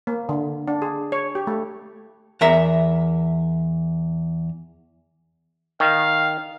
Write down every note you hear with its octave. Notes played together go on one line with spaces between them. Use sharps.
A#3
D3
D4
G#4
C#5
G4
A3
E2 A#4 E5 A#5
D#3 F5